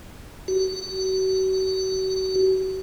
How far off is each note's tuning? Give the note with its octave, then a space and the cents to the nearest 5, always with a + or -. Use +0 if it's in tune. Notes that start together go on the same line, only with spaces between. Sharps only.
F#4 +40